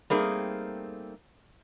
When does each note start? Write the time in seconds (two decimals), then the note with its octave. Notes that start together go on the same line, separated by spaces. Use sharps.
0.10 G3 A3 A#3 C4 D#4 G#4